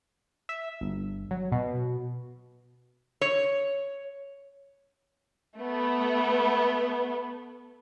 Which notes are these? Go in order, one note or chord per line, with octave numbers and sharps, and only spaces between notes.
E5
G1
F#3
B2
C#5
A3 B3